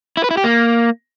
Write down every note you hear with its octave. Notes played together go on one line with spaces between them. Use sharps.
E4
B4
E4
G4
A#3